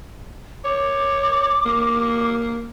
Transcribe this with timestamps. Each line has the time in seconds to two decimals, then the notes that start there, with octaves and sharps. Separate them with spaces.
0.65 C#5 D6
1.65 A#3